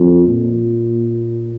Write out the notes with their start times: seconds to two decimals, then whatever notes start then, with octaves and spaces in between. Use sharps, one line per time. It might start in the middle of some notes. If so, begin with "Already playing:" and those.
Already playing: F2
0.27 A#2